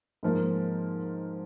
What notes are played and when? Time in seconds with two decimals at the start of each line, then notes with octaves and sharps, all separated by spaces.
0.23 G#2 F3 A#3